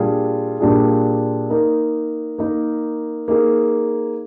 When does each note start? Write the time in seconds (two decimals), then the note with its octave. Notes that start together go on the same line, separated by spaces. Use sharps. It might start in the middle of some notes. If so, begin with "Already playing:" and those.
Already playing: A#2 G3 D4 F4 G#4
0.60 A#2 G3 D4 F4 G#4
1.49 A#3 D#4 A#4
2.38 A#3 D#4 A#4
3.28 A#3 D#4 G#4